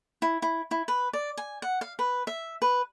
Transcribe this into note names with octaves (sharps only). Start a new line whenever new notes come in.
E4
E4
E4
B4
D5
G#5
F#5
F5
B4
E5
B4